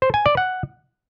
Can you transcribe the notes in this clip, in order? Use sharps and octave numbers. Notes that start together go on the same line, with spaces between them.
C5
G#5
D5
F#5